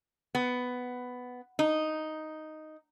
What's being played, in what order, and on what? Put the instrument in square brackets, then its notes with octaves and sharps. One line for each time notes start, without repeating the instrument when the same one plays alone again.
[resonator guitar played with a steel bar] B3
D#4